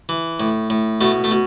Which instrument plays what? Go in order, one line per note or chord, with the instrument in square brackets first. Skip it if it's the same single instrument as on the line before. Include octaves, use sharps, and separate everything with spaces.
[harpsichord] E3
A2
A2
B2 A3
A3
B2